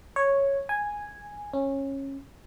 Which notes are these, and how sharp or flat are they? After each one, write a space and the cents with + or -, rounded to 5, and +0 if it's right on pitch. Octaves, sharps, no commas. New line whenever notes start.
C#5 -5
G#5 -5
C#4 -20